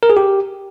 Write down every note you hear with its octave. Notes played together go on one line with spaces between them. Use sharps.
A#4
G#4
G4